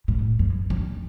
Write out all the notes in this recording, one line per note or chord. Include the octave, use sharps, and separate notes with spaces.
A2
F#2
F#2